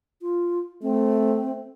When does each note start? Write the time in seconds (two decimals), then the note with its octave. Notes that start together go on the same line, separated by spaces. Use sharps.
0.22 F4
0.83 A3 C4